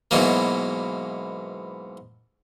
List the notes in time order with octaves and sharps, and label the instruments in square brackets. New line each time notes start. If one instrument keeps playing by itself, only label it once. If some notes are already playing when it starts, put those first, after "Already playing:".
[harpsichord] G#2 B2 E3 F#3 A#3